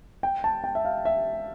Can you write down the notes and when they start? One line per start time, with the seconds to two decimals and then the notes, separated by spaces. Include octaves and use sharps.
0.23 G5
0.44 A5
0.64 G5
0.75 E5
0.85 F5
1.05 E5